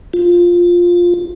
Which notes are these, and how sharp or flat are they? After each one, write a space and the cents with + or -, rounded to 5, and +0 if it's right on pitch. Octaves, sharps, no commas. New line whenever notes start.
F4 +5